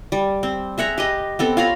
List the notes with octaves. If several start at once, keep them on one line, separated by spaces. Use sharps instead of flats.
G3
C4
G#4 E5 F#5 A#5
G4 B4 D#5
B3 C4 A4
F4 C#5 A#5 B5